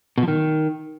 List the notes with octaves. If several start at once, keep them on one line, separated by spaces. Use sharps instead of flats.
B2
F3
D#3